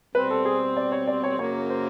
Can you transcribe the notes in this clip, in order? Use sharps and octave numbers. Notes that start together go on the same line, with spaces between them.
B2 G3 C4 B4
A4
G#4
D5
C#5
D5
C#5
F#2 C#3 F#3 A#3 C#5
C5